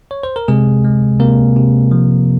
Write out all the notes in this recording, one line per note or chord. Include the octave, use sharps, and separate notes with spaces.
C#5
C5
A#4
C3 G#3 G#4
G#3
C3 A#3 A#4
C3
F3